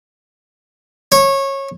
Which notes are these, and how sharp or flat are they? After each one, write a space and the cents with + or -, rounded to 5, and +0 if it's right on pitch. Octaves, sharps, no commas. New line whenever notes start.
C#5 -20